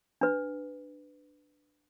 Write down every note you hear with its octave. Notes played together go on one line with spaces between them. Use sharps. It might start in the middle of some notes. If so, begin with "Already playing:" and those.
D4 B4